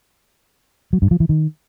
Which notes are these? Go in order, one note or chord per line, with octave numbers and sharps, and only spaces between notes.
F#3
G2
F3
E3
D#3